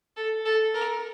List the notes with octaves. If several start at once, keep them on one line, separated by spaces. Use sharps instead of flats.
A4
A4
A#4